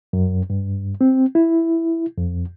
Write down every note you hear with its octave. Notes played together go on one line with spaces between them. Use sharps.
F#2
G2
C4
E4
F2